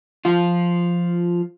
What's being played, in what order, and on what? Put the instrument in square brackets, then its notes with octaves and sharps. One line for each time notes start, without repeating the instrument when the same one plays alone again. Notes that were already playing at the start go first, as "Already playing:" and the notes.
[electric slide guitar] F3 F4